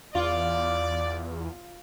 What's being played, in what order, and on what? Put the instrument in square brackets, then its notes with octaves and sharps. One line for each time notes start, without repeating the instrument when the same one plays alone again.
[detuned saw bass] E2 [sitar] F4 [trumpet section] D5